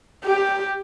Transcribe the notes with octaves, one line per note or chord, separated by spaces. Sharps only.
G4